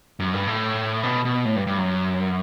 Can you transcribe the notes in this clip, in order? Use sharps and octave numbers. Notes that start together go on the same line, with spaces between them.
F#2
G2
A2
B2
B2
A2
G2
G2
F#2